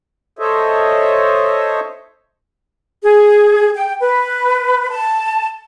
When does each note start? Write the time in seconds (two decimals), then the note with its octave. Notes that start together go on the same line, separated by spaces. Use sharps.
0.39 A4 C5 C#5 D#5 E5
3.03 G#4
3.74 G5
4.00 B4
4.90 A5